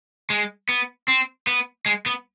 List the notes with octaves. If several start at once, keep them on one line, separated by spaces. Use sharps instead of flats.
G#3
B3
C4
B3
G#3
B3